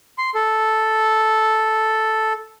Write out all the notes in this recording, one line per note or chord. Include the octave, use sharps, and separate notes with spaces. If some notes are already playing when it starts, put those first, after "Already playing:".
C6
A4